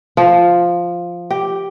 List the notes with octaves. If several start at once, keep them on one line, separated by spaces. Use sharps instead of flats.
F3
G4